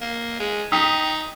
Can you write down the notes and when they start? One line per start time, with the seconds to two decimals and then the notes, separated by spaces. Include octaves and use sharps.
0.01 A#3
0.40 G#3
0.72 D#4 G5 D#6 B6